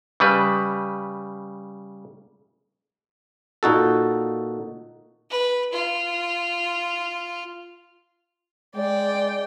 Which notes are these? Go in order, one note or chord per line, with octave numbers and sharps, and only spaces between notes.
C#3 G3 B4
A#2 D#4 F#4 A4
B4
F4
G#3 D5 G5